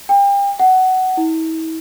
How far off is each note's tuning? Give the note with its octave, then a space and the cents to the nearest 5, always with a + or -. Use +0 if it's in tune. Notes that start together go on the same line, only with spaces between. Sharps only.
G5 +35
F#5 +15
E4 -40